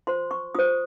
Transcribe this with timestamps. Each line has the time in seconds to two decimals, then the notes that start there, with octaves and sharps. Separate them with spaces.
0.07 F4 C5 C6
0.31 C#6
0.55 F4 C5 D#6